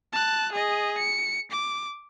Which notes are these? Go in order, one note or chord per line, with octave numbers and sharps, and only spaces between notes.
A5 F#6
G#4 D#5
C#7
D6